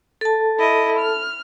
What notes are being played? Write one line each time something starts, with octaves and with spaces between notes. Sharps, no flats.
A4 A5
E4 D#5
F6